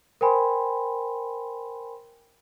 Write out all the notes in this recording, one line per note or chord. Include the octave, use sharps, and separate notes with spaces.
A#4 C5 G5 G#5 B5 C6